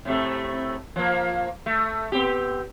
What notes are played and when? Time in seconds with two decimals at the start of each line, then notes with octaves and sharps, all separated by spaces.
0.05 A2 C3 A3
0.96 F3 A#3
1.66 A3
2.12 B3 C4 G4